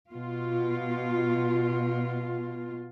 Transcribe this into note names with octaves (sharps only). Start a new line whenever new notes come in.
B2 F4